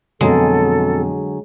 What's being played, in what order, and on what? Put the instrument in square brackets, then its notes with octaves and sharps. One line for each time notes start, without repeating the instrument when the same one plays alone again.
[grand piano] F2 B2 [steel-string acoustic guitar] D3 F#3 G#4 [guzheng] G#3 [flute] A4